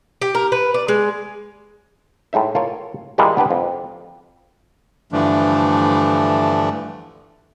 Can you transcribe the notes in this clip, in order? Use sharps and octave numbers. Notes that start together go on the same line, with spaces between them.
G4
A#4
B4
D5
G#3
A2 G#3 D#4 E5
F4 A4 A#4 C#5
E3 G3 G#3 F4 A#4
B3 D4 G4 B4
F2
G2 D3 E3 F3 A3 D4